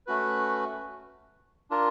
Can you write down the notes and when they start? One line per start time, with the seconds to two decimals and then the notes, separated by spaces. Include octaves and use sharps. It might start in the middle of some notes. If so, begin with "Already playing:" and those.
0.07 A3 C#4 F#4 B4
1.71 D4 F4 A#4